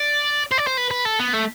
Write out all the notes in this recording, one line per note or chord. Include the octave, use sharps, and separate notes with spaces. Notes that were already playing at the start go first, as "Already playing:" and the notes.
Already playing: D5
C5
D5
C5
B4
B4
A4
B3
A3